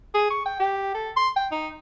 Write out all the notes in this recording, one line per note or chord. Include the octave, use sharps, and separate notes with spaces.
G#4
C#6
G5
G4
A4
C6
G5
D#4